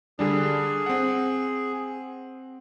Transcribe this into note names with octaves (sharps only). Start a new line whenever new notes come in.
D3 G3 D4 G#4
C4 F#5